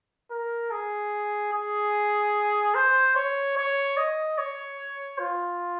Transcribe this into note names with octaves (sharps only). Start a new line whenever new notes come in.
A#4
G#4
G#4
C5
C#5
C#5
D#5
C#5
F4